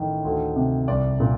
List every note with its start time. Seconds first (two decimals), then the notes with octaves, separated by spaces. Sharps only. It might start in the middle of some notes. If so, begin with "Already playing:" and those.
Already playing: A1 A2 D#3
0.24 D2
0.56 C3
0.88 C2 D5
1.20 A#2